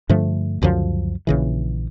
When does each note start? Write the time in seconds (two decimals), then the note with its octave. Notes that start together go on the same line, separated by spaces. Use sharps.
0.09 G2 D3 F3 A3
0.62 C#2 F#2 D3 F3
1.27 A#1 C#3 E3